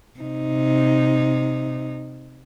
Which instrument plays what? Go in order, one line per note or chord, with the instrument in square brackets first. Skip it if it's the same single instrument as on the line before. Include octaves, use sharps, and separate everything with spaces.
[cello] C3 D#4